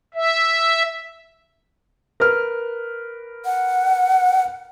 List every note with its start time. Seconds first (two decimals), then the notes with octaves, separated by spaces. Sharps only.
0.14 E5
2.20 A#4 B4 F6
3.45 F#5